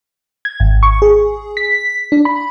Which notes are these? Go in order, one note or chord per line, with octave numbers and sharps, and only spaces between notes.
G#6
G#1
C#6
G#4
B6
D4
B5